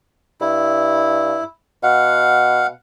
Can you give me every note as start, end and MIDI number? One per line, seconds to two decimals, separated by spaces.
0.41 1.39 43
0.41 1.44 64
1.83 2.68 47
1.83 2.67 77
1.83 2.67 78